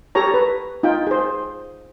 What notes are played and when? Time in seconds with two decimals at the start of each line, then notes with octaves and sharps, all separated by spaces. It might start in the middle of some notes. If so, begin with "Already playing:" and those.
0.15 G4 A4 C#5 A#5
0.34 B4
0.83 D#4 F4 G5
1.07 G#4 C5